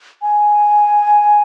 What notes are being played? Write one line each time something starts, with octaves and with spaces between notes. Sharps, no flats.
G#5